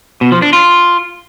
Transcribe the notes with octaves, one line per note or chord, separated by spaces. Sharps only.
B2
F3
D4
F4